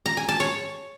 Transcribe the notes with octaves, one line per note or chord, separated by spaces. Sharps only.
A#5
G#5
A5
C#5